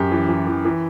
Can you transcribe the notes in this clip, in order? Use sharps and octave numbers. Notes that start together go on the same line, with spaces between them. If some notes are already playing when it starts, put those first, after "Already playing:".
Already playing: F#2 G4
E3
E3
E3
E3